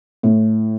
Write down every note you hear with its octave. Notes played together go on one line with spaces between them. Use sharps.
A2